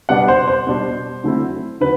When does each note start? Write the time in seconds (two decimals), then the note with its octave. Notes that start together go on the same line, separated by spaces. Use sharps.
0.09 B2 G3 B3 D4 F#5
0.28 C5
0.48 C5
0.67 B2 G3 B3 D4
1.24 D3 F#3 A3 C4 E4
1.81 D3 F#3 B4